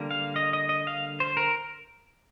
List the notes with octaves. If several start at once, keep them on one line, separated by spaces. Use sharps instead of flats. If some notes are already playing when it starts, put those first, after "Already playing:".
Already playing: D3 G3 A#3
F5
D#5
D#5
D#5
F5
C5
A#4